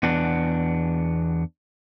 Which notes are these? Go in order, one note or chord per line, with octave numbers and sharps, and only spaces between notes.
E2 B3 D4